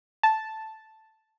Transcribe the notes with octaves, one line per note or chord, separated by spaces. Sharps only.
A5